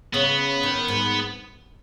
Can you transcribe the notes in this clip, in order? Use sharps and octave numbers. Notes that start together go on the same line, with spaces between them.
C#3 B3
D#3
G#2